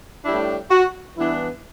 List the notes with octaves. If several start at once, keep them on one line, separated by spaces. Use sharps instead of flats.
A2 G3 D4 E4
F#4
G2 E3 B3 D4 E4